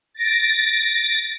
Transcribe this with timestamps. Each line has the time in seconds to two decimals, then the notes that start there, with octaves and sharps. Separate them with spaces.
0.14 A6 A#6 D7